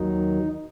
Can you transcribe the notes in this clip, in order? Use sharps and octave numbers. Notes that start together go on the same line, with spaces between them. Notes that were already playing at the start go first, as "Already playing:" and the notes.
Already playing: D#2 D#3 F#3 D#4